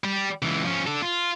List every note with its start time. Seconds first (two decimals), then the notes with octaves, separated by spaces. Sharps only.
0.04 G3
0.42 C#2 E3
0.65 F3 C#4
0.87 D4 A4
1.02 F4